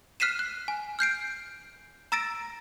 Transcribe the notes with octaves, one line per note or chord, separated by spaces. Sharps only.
F6 F#6 B6 C7 D#7 E7
F#6
G#5
F6 G6 C7 D7
A#5 E6 A6 A#6 D7